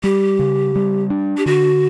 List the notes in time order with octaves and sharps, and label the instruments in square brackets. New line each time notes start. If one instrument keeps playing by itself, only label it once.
[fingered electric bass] G3 [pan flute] G4
[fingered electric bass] C#3
G3
D4
[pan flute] G4
[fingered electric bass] D3 [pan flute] F#4